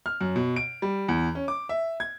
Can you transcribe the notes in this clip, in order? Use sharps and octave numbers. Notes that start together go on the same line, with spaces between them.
F6
F#2
B2
D7
G3
E2
C#4
D6
E5
G#6